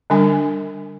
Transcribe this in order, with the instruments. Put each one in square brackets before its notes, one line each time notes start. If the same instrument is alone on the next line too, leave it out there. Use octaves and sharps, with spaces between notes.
[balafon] D3 G3 D4 G#5